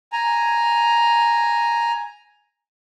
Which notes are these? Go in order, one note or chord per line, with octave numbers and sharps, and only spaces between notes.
G#5 A#5